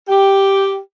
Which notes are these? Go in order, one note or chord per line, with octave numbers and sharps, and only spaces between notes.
G4